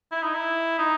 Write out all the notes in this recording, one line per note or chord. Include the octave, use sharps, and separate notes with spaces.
E4
D#4
E4
D#4